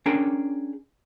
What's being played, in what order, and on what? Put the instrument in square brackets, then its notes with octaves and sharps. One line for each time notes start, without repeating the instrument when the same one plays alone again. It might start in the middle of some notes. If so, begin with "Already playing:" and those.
[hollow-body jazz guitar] C#4 D4 G#4 A#4 G5 A#5